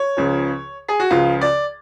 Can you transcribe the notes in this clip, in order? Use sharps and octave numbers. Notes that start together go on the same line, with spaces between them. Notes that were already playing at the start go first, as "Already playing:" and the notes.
Already playing: C#5
C#2 C#3 F3
G#4
F#4
C#2 C#3 F3 F4
D5